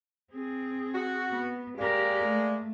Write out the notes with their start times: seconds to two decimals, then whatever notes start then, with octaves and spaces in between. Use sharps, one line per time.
0.33 C4 G#4
0.95 F#4
1.31 B3
1.78 G#3 A#3 G4 A#4 D5
2.26 A3